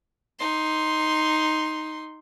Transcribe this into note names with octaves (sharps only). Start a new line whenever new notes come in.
D#4 C6